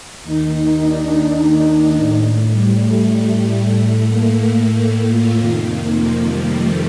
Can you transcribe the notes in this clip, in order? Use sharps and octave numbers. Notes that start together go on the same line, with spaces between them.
D#2 D#3 D#4
D#4
D4
A2 D4
G3
A3
G3
A2 A3
A#3
A3
A#3
F4
F2 C3 D#3 F4
A#3
F3
G3
A3